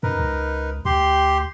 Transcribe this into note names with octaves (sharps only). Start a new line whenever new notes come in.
F#2 D#4 A#4 B4
C#2
D2 G4 C6